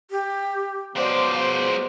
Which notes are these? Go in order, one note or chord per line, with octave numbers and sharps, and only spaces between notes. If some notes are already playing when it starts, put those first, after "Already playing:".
G4
F#3 G#3 B3 C5 D5 F5